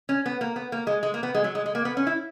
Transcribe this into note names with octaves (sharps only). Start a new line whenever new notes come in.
C#4
B3
A#3
B3
A#3
G#3
G#3
A#3
B3
G#3
F#3
G#3
G#3
A#3
B3
C#4
E4